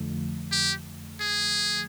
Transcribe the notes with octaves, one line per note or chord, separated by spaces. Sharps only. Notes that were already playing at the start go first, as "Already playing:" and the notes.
Already playing: F2 D3 F3 A3
G4
G#4